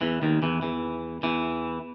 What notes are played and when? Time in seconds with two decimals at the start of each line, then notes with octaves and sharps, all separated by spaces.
0.01 E2 E3
0.22 D#2 D#3
0.43 E2 E3
0.62 E2 E3
1.23 E2 E3